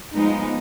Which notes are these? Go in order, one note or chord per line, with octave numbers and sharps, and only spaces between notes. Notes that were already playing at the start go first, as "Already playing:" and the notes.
F3 G#3 B3 D#4